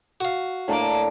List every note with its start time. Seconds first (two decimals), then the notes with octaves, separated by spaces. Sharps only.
0.21 F#4 F5
0.68 A2 A#3 D4 A5 D6